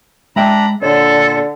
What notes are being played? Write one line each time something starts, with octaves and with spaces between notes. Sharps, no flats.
G#3 D4 E5 G5 A#5 B5
A#2 D3 A4 C#5